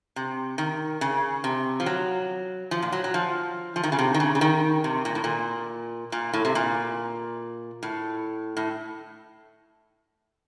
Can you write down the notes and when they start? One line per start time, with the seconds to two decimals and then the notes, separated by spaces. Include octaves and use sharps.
0.16 C3
0.58 D#3
1.01 C#3
1.44 C3
1.80 F3
1.86 F#3
2.71 F3
2.82 A#2
2.92 F#3
3.04 F#3
3.14 F3
3.76 F3
3.83 D#3
3.92 C#3
3.99 C3
4.14 D#3
4.20 C#3
4.35 C#3
4.41 D#3
4.84 C3
5.05 A#2
5.15 A2
5.24 A#2
6.12 A#2
6.33 A2
6.45 C3
6.55 A#2
7.83 A2
8.57 A2